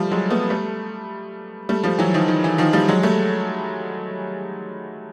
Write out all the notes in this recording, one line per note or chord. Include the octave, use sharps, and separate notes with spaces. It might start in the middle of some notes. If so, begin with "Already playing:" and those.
Already playing: F3 G3 A3
F#3 G#3
A3 B3
G3 A3
G3 A3
F3 G3
E3 F#3
D#3 F3
D#3
E3
D#3 F3
F3 G3
F#3 G#3
G3 A3